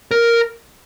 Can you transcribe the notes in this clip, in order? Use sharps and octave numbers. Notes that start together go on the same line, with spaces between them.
A#4